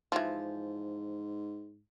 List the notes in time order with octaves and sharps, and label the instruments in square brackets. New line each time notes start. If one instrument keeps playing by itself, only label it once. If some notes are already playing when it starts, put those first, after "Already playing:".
[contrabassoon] G#2 [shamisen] E3 F3